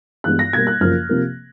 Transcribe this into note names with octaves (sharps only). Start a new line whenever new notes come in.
G2 E3 G#3 B3 F#6
A#6
B2 G3 A#3 G#6
F#6
F#2 C#3 F3 A#3 F6
C3 F3 A#3